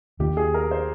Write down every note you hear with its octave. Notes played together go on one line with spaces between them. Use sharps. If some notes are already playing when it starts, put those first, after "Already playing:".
D#2 D#3 A#3 G4
G#4
A#4
C5